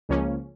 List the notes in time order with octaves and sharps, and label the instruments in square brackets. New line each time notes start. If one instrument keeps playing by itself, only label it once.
[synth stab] C#2 C#3 F3 A#3 C#4